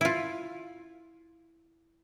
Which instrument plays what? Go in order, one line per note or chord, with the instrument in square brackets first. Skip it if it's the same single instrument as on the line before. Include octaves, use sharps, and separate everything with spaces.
[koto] E4 F4